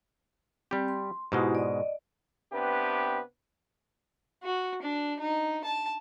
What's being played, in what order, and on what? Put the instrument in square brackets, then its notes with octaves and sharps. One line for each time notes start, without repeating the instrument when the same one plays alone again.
[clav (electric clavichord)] G3 G4 [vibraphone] C4
[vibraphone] C6
[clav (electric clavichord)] G#2 B2 G#3 [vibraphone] E4 F#4 G4
[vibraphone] D5 D#5
[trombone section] C3 B3 D4 G4 B4
[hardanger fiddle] F#4
D4
D#4
A5